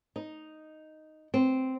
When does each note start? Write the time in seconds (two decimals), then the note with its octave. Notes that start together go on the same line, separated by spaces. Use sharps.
0.16 D#4
1.34 C4